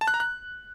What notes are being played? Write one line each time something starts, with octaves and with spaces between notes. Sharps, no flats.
A5
F#6
A#5
F#6